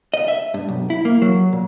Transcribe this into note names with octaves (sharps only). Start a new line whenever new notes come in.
D#5
E5
G2
B1
E4
A#3
F#3
A#2